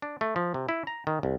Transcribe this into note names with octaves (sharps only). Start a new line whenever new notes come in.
D4
A3
F3
C3
E4
A#5
D#3
C2